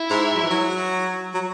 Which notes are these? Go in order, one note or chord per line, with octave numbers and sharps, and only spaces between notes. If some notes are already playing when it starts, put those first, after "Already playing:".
Already playing: E4
G#2
F#3
E3
F#3
F#3